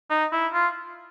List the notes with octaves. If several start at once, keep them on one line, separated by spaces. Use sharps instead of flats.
D#4
E4
F4